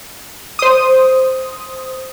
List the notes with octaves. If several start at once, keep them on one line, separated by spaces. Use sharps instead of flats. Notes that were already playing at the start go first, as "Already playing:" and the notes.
C5 D#6